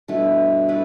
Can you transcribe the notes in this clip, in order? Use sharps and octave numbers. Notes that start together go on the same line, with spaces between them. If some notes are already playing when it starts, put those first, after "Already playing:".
G2 B2 A3 E4 B4
A3 E4 B4